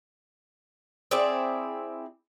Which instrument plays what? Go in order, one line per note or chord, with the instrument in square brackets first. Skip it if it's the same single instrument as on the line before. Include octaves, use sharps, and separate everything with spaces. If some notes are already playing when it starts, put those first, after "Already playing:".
[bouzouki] C4 E4 G#4 D5